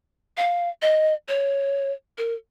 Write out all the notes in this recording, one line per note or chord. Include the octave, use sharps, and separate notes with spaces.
F5
D#5
C#5
A#4